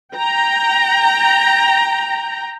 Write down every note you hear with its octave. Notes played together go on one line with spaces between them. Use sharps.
G5 A#5